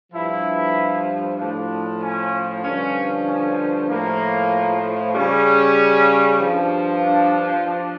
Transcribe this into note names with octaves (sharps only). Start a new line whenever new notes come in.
G2 F3 E4
A2 F3 D4
C#4
G2 D3 F3 C#4
C#4
A2 F3 A#3
C#3 G3 C#4
G2 F3
D4
F3 D4